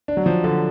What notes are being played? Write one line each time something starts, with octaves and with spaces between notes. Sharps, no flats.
D4
F#3
F3
D3